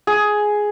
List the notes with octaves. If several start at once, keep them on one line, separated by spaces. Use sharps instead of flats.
G#4